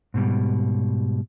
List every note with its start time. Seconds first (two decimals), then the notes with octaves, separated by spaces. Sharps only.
0.14 G#2 B2 G3